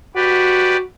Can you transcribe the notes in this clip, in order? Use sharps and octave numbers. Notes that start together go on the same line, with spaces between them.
F#4 G4 B4 D5